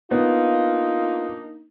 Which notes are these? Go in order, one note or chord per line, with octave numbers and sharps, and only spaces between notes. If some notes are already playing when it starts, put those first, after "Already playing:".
A#3 B3 D4 D#4 F4